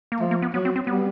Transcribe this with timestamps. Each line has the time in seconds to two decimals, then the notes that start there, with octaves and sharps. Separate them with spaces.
0.12 A#3
0.20 F3 A3
0.31 A#3
0.42 B3
0.54 F#3 B3
0.65 C4
0.76 C4
0.87 G3 B3